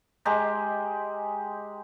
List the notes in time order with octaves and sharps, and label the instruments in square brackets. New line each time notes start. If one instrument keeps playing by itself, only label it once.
[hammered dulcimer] G#3 G4 A#5